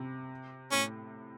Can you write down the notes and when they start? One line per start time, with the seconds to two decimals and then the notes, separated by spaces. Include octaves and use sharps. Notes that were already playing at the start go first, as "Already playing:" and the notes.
Already playing: C3
0.71 A2 C#4